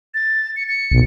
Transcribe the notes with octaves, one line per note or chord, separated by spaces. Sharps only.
A6
C#7
C#7
B1